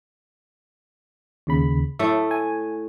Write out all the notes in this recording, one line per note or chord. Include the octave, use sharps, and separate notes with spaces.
D#2 C#3 B5
A2 A3 E5
G#5